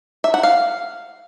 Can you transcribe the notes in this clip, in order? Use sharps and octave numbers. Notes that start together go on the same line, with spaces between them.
E5
F#5
F5